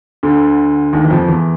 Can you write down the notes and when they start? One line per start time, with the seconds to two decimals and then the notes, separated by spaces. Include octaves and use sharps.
0.23 D2 D3
0.93 D#2 D#3
1.04 E3
1.11 F2 F3
1.28 E2 E3